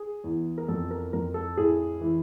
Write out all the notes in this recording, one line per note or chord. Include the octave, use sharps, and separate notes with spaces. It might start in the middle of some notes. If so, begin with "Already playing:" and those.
Already playing: G#4
E2
A#4
F2 A4
A#4
F2 A#4
A4
A2 G#4
E3